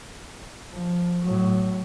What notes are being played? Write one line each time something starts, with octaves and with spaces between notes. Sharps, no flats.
F3
A2 F#3